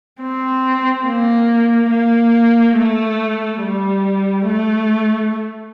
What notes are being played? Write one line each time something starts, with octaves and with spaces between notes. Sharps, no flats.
C4
A#3
A#3
A3
G3
A3